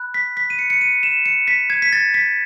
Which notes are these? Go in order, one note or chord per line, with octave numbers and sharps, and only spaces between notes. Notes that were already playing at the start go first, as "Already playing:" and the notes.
Already playing: B5 F#6
B6
B6
D#7
C#7
C#7
D#7
E7
C#7
B6
G#6
B6
A6
B6